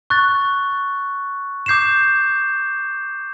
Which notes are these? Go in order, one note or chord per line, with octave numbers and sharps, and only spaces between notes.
C#6 F#6 A6
D6 G6 C7 E7